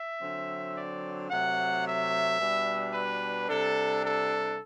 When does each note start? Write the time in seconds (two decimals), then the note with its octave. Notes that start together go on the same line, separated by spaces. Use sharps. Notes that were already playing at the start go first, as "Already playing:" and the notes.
Already playing: E5
0.20 D3 F#3 C4
0.75 D5
1.30 C3 F#3 A3 C4 F#5
1.85 E5
2.39 B2 G3 D4
2.93 B4
3.48 C3 G3 D4 A4
4.02 A4